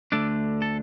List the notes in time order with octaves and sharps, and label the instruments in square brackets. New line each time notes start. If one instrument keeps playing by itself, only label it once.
[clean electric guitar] D2 D3 A3 D4 D5
A4